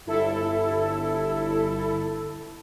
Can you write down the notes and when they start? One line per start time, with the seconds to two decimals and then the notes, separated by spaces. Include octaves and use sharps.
0.06 G1 E4 A4